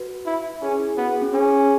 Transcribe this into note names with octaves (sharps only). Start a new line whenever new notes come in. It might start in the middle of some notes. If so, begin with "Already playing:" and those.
Already playing: F#4 B4
E4
C#4 G#4
E4
B3 F#4
G#4
C#4
C#4 G#4